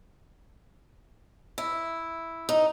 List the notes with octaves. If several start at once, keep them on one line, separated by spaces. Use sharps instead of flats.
E4
D#4